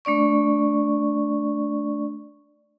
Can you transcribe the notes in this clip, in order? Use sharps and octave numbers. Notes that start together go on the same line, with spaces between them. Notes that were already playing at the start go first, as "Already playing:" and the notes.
A3 D4 D5 C#6